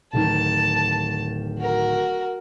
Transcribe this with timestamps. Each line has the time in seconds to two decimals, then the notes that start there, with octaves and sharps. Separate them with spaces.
0.13 D1 D#3 A5
1.59 F#4 A#4